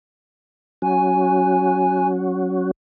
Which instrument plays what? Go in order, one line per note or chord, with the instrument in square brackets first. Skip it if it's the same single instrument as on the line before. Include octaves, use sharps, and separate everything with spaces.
[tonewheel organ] F#3 C#4 F#4 [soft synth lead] G#5